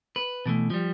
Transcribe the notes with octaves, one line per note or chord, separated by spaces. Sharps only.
B4
B2 E3 A3
F3 G3